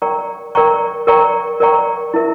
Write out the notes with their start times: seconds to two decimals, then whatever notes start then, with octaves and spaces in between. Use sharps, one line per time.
0.02 A#4 D5 G5 A#5 C#6
0.55 A#4 D5 G5 A#5 C#6
1.07 A#4 D5 G5 A#5 C#6
1.60 A#4 D5 G5 A#5 C#6
2.14 E4 A#4 E5